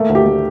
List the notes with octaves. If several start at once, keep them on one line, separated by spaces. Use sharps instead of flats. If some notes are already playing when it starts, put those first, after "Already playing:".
Already playing: A3 A#3
D2
G4
A3